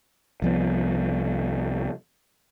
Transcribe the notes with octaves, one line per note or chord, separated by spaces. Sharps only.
C2 F3 B3